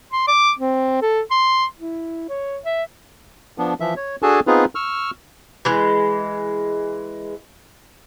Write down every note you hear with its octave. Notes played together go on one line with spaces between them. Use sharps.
C6
D6
C4
A4
C6
E4
C#5
E5
F3 B3 D4
E3 F3 E5
C#5
D4 F#4 G#4 A4 G#5 A5
B3 C4 D#4 F4 G#4 B4
C#6 E6 F6
E3 G#3